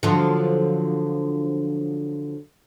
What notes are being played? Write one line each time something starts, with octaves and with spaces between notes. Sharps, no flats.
D3 F3 F#3